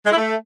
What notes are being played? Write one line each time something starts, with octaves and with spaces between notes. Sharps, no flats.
G#3
E4
A3